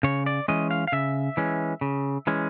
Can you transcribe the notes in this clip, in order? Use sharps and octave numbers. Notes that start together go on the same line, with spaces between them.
C#3 C#5
D5
E3 G#3 C#4 D#5
F5
F5
C#3 E5
E3 G#3 C#4
C#3
E3 G#3 C#4